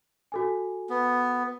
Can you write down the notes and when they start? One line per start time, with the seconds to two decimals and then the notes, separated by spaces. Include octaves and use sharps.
0.32 F#4 A4 G#5
0.90 B3